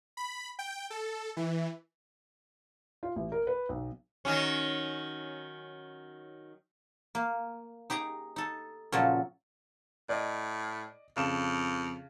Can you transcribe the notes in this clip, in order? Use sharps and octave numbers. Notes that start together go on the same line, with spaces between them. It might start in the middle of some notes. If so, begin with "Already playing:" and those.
B5
G5
A4
E3
F4
A1
A#4
B4
B1
D#3 F#3 C#4
A#3
D#4 G4 G#4 A#5
D#4 A4
A#2 C#3 F3 F#3 A4
A2 D5 D#5
F2 C#3 A5 E7